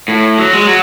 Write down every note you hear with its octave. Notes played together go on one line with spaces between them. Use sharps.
A2
F#3
G#3
F#3